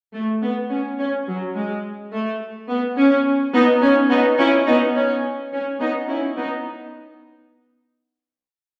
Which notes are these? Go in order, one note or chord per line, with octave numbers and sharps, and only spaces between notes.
A3
B3
C#4
C#4
F#3
G#3
A3
B3
C#4
B3 D#4
C#4
B3 D#4
C#4 E4
B3 D#4
C#4
C#4
B3 D#4
C#4 E4
B3 D#4